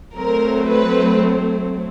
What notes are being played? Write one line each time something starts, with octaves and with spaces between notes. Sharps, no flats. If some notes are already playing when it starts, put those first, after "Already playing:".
F#3 A3 C4 A#4
B4